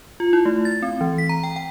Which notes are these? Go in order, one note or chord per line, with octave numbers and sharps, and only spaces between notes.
F4
E4
A3
A6
C4
E3
B6
A#5
G5
G5